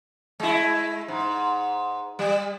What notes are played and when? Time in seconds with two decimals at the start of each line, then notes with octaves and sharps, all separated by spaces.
0.40 G#3 E4
1.08 G#2
2.19 G3